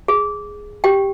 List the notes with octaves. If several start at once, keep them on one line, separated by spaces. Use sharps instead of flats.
G#4
G4 G5